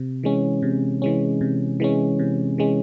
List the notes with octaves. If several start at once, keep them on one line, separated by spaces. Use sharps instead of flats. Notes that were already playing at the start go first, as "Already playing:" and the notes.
Already playing: C3
E3 G#3 C#4
C3
E3 G#3 C#4
C3
E3 G#3 C#4
C3
E3 G#3 C#4